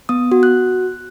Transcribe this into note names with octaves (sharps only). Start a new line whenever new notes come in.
B3 D#6
F#4
F#6